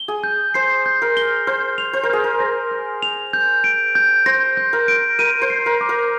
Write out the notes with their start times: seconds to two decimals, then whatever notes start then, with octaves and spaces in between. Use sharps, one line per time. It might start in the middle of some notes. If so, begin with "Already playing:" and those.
Already playing: G7
0.08 G#4
0.24 G6
0.54 C5 C7
0.86 G6
1.02 A#4
1.17 G7
1.47 C5 F6
1.78 F7
1.93 C5
2.03 A#4
2.10 G#4 F6
2.24 A#4
2.40 A#6
2.71 F6
3.02 F7
3.33 G6
3.64 D7
3.95 G6
4.26 C5 A#6
4.57 G6
4.73 A#4
4.88 D7
5.19 A#4 D#7
5.42 C5
5.50 C7
5.66 A#4
5.81 D6
5.89 A#4